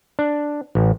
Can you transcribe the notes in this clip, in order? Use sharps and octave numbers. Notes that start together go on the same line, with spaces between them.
D4
A1